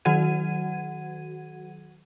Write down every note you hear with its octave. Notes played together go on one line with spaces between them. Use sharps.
D#3 F#3 F#4 F#5 G#6 D#7